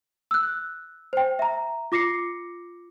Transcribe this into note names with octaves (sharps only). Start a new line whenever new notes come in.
E6 F#6
C5 G5
E5 A#5
F4 D6 A#6 C7 C#7